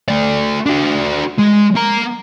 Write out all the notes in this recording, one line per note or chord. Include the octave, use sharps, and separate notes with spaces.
A3 D5
D4 F#4
G#3
A#3 A#5